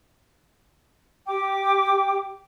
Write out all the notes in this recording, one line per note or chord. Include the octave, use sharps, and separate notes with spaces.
G4 G5 D6